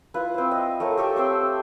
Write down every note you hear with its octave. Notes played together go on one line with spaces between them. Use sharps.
E4 F4 B4
C4 C5
D#5
A3 A4 A#4 C#5
G4 A4 E5 G5
C4 C5 G5 C6